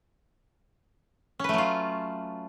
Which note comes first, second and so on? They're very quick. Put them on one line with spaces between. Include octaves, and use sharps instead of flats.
C#4 B4 A3 F#3 F4